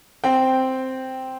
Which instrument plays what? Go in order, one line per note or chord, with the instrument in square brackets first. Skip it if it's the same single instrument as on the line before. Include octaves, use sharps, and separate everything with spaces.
[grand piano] C4 G5